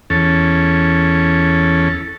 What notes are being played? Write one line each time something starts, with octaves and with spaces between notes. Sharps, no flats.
E2 C#4 A4